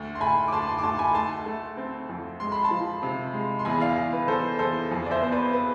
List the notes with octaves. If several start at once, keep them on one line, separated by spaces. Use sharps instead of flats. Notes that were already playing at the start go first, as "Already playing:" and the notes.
Already playing: D2
C6
D2 G#5 B5
D6
D2 A5 C6
A5 C6
D6
D2 A5 C6
G#5 B5
A3 A5 C6
A3
C4
F2
G#3 C6
B5
A5 C6
F3
C3
G#3
C6
E2 G#5 B5
D5 F5
E2
B4
E2 A4 C5
E2 A4 C5
F2
D5
C5 E5
B3 C5
B4 D5
B4